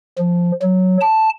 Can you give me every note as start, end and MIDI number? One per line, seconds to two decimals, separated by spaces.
0.18 0.52 53
0.62 0.97 54
1.01 1.29 81